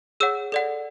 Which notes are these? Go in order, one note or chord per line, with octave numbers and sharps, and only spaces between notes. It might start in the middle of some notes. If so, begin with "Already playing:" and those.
G#4 C#5 F#5 E6
A4 D5 F#5